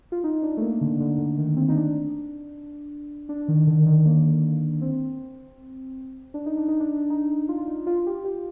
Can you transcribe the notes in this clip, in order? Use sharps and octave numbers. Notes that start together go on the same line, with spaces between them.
F4
D#4
D4
A3
A#3
D3
D3
D3
D#3
C4
D#4
D4
D4
D#3
D3
D#3
A#3
C4
D4
D#4
D4
D#4
D4
D#4
F4
D#4
F4
G4
G4